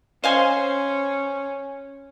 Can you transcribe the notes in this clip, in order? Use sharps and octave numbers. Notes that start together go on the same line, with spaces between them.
C#4 C5 D#5 F5 G#5 C6